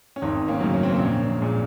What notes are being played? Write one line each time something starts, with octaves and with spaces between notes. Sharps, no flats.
C#4
G#1 C4 D#4
A#3 C#4
F#2 C#3 F#3
C#4
C4
A#3 C#4
A#1
A#2 G#3